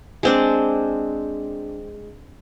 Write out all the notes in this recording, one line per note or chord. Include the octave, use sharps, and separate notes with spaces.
G#3 C4 D4